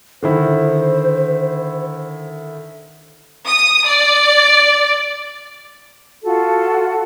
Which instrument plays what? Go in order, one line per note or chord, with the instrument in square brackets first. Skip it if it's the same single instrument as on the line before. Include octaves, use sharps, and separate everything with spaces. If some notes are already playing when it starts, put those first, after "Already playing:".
[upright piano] D3 D#3 E4 [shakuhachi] C5
[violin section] D#6
D5
[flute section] F4 F#4 A4